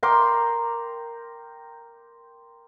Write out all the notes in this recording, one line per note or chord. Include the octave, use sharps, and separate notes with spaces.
A#4 G5 C6 D6